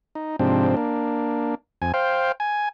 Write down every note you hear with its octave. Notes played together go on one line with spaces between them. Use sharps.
D#4
G#2 C3 F3 C4 D4
A#3 D4
F2 G#5
C5 F5 G5
G#5